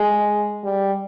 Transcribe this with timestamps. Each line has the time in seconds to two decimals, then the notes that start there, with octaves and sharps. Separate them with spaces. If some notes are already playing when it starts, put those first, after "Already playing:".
Already playing: G#3
0.64 G3